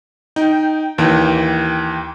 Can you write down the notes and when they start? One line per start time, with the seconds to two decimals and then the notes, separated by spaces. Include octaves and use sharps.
0.36 D#4 G5
0.98 D#2 E3 G5